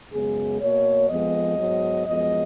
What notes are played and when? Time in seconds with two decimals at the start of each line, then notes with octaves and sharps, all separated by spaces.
0.12 F#2 C#3 G#3 B3 G#4
0.60 B2 A#3 C#5
1.10 F2 F3 G#3 B3 D#5
1.59 G#2 F#3 B3
2.06 F#2 F3 G#3 B3 D#5